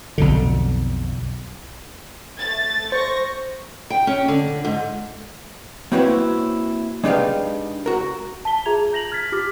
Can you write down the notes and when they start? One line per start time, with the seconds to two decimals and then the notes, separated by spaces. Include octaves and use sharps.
0.18 B1 F2 D3
2.39 A3 A6
2.92 C5 C#6 A#6
3.90 G5
4.07 C#4
4.28 D3
4.65 G#2
5.92 A#3 C4 E4 F#4 B4 C#5
7.04 G#3 D4 D#4 G4 B4 F5
7.86 F#4 A#4
8.45 A5 B6 G7
8.65 F4 G#4 E5 A#5 G#6 F7
8.93 G6 A#6 F7 F#7
9.12 F6 G#6 A6 B6
9.32 F4 G4 D6 F6 B6